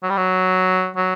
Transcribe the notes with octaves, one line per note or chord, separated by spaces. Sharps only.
F#3
G3
F#3
F#3